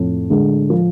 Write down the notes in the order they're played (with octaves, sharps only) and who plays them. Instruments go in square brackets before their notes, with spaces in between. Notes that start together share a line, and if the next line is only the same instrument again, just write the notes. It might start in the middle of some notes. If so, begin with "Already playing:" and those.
Already playing: [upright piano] F2 [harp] A2
[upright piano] D3 G#3
F3